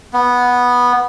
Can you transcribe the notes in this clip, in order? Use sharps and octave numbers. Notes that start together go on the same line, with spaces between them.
B3